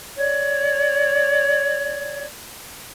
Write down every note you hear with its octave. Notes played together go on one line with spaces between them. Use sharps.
C#5 D5